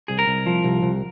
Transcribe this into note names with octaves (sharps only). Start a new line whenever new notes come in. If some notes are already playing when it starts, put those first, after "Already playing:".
C2 G#4
A#4
C2
F3
C2
C2